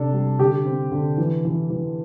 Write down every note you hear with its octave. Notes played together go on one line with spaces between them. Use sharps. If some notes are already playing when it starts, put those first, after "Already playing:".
Already playing: C3 D4 A4
G3
D3 G4
C4
D3
E3
E3
E3